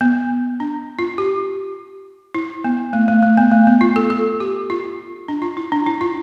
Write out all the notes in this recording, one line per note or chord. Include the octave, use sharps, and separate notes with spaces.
B3
D4
F4
G4
E4
B3
A3
A3
A3
B3
A3
B3
F4
A4
A4
G4
F4
D4
F4
E4
D4
E4
F4